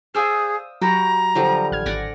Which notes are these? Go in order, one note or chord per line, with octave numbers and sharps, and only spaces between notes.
G#4 C5 D5 E5 F5 D#6 E6
F#3 F#4 G4 A#5 B5
D3 F3 G3
A1 F6 G#6
G#1 D5 F#5 G#5 A#6